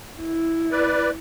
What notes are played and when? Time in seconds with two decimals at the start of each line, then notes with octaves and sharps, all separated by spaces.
0.21 E4
0.71 B4 D5